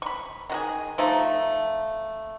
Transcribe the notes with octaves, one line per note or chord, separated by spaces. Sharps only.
B5 C#6
D#3 F#4 G#4
F3 A3 D#4